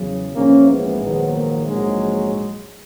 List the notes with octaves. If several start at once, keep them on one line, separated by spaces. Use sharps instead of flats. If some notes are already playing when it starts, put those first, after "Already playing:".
Already playing: E2 C#3 F#3
A#1 G#2 E3 A#3 C#4
G#3 B3
A#1 G#2 D#3 F#3
A#3
A#1 G#2 F#3 G#3